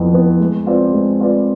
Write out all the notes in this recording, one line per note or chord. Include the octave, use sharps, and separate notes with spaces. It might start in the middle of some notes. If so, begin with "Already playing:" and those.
Already playing: F2 E3 B3
E3 B3
G#3
C4 F4 B4 D5
G#3
C4 F4 B4 D5